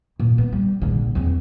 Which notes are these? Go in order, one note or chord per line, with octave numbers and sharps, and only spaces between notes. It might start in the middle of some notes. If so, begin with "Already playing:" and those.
A#2
B3
G3
A#1 D3
E2 C4